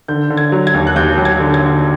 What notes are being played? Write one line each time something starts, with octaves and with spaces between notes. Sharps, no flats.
D3 G6
D3
G#6
F#3
G#6
D#2
F#6
D#2 G6
F#3
G#6
D3
G#6
D3